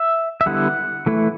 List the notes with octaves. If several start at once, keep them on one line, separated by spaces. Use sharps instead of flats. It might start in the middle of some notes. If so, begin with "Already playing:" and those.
Already playing: E5
E5
D3 G3 B3 E4 F#5
E3 A3 E4